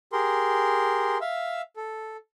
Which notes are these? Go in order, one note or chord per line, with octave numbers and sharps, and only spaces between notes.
G4 G#4 A#4 C6
E5 F5 E6
A4